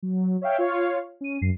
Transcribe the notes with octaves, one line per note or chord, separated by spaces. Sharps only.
F#3
C#5 E5 F5 G5
F4 C#5 F5
C#4 D#7
F#2 C7